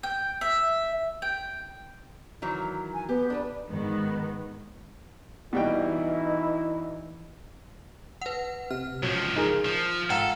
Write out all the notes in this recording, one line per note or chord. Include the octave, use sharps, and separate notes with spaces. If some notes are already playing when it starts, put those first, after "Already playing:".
G5
E5
G5
D#3 E3 F#3
G#5
B3 G4
D4 A#4 B4
G#2 D#3 B3
B2 E3 G3 D#4 E4 G5
B4 F#5
C3 F6
C#2 F3 F#3
D#4 G#4 A#4
F3
G#2 F4 A4 F#5 G5 A#5